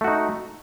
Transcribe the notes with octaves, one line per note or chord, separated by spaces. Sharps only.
A3 D#4 F#4